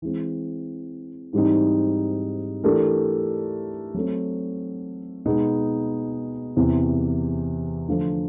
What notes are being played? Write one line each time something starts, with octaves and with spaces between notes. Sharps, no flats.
E3 G#3 C4
G#2 E3 G3 C4 D#4
E3 A3 D4 G4 A#4
F#3 A3 C4
B2 G#3 B3 D#4
E2 C3 E3
D3 F3 A3